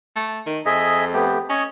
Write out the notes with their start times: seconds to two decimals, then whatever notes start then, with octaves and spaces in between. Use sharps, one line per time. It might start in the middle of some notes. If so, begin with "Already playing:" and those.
0.16 A3
0.46 D#3
0.66 F2 G#4 D#5 E5
1.14 A3 B3 G4
1.50 C#4 C#5 D#5